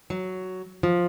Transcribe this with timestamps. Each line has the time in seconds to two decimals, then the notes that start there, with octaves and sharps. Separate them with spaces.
0.10 F#3
0.83 F3